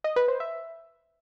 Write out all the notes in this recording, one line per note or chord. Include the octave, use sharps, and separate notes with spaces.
D#5
B4
C5
E5